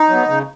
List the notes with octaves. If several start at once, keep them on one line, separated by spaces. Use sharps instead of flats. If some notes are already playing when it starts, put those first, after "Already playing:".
Already playing: D#4
F#3 B3
C#3